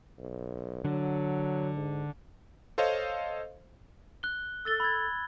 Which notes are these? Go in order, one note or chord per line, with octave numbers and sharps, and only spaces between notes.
B1
D3 F#3
G#2
A4 C5 C#5 D#5 F5
F#6 G7
A4 E6 A6 G7
B5 G#6